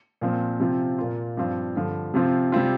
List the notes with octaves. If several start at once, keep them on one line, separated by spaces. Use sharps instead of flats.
A#2 F3 C4
C3 F3 C4 F4
A#2 A#3 F4
G2 F3 C4 F4
G2 D3 F3
C3 F3 C4 F4
C3 G3 C4 F4